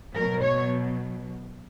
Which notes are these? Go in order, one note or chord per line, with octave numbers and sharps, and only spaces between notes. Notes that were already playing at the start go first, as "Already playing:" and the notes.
B2 F#3 A#4
C#5